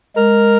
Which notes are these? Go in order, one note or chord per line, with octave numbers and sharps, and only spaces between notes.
G#3 A#4